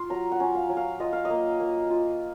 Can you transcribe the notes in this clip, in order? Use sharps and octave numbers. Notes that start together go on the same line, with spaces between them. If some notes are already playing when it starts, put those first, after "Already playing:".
Already playing: F4 C6
F#3 A#5
F#5
C#4
F5
F#3
F5
F4 D#5
F5
D#5
A#3
A#3
F4